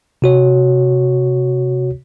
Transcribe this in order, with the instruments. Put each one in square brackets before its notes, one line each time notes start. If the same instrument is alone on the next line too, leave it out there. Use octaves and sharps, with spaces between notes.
[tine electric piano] C3 F#4 C#5